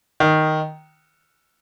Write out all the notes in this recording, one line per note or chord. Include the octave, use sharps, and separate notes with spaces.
D#3